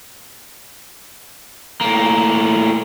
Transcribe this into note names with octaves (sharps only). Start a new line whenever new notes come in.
A2 A#3